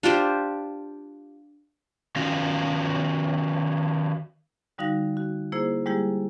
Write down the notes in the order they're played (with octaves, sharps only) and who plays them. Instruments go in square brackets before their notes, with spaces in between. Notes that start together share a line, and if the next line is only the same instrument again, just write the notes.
[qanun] D4 F4 G4 C5
[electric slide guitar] D#3 C#4 F4 F#4
[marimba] D3 G3 D#4 F#4 F5 A#6
F#4
A#3 E4 G#4 C5
G3 G#3 A#3 E4 G4 G#4